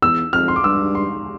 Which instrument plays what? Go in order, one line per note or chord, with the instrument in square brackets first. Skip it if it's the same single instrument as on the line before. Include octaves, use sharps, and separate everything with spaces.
[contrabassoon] E2 [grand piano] E6
[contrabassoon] F2 [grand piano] F6
[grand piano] C6
D6
[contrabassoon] G2 [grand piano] E6
[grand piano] C6